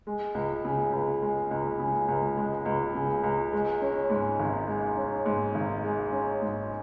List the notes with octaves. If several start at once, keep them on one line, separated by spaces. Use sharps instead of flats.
G#3
C#2
C#3
C#2
G#3
C#2
C#3
C#2
G#3
C#2
C#3
C#2
G#3
C#4
G#2
G#1
G#3
C#4
G#2
G#1
G#3
C#4
G#2